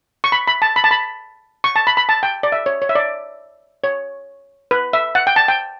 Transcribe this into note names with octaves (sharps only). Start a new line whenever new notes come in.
C#6
B5
B5
A5
B5
A5
B5
C#6
A5
B5
B5
A5
G5
D5
E5
C#5
C#5
E5
D5
C#5
B4
E5
F#5
G5
A5
G5